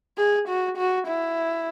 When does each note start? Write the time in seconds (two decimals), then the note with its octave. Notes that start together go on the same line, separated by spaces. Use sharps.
0.18 G#4
0.48 F#4
0.77 F#4
1.07 E4